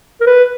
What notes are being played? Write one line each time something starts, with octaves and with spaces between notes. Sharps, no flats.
A#4
B4